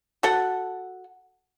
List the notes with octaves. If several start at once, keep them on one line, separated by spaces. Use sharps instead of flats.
F#4 A4 F#5